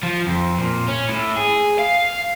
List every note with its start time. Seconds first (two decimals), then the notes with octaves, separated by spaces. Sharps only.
0.03 F3
0.27 F2
0.59 A#2
0.88 C#4
1.09 A2
1.36 G#4
1.79 F5